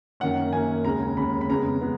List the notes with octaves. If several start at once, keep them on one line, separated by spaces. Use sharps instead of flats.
F#2 D#3 A#3 C#4 F#5
F#2 D#3 A#3 C#4 G#5
D#2 C#3 G#3 A#5
D#2 C#3 G#3 B5
B5
F2 C#3 G#3 B3 A#5
C#3 G#3 B3